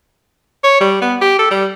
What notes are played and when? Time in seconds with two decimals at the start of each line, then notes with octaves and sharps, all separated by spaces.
0.63 C#5
0.80 G3
1.01 B3
1.21 G4
1.39 A4
1.51 G3